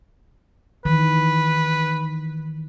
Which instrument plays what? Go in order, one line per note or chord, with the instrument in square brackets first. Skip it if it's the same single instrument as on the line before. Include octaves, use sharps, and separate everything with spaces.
[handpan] D#3 E3 [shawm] B4